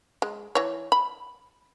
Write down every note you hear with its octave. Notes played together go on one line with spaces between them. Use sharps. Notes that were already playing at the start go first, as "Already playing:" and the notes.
G#3
E3 C#5
B5